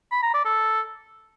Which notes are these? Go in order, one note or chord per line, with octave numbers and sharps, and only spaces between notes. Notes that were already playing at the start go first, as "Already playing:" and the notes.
B5
A#5
D5
A4